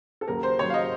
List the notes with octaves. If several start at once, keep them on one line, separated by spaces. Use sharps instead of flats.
A4
D#2 C#3 F#3 A#4
C5
D#2 C#3 F#3 C#5
F5
D#5